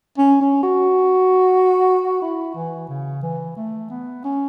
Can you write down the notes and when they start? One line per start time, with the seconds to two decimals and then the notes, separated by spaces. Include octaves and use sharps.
0.18 C#4
0.41 C#4
0.63 F#4
2.22 E4
2.55 E3
2.89 C#3
3.23 E3
3.57 A3
3.90 B3
4.25 C#4